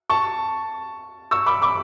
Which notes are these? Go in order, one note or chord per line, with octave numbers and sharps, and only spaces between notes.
A5 C#6
C#6 E6
B5 D6
B5 D6